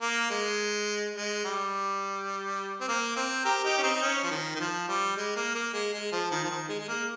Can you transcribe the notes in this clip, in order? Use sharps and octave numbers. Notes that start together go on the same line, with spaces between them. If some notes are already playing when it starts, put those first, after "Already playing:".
A#3
G#3
G#3
G3
C4
A#3
C4
G4 A#4
D#4 G4
C#4
C4 D#4
D#4
C#4
F3
D#3
D#3
F3
G3
G#3
A#3
A#3
G#3
G#3
F3
D#3
F3
D#3
G#3
G#3
A#3